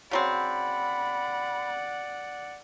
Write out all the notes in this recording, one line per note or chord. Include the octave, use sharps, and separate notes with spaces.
C#3 F#3 C4 D5 F#5 B5